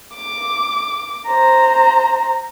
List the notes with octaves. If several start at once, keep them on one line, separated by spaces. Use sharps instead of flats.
D6
C5 A#5